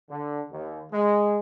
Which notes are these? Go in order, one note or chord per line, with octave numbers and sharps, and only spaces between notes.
D3
D#2
G#3